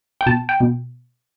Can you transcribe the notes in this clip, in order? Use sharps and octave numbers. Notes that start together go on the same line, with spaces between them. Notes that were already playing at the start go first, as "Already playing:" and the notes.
G5
B2 A5
G5
B2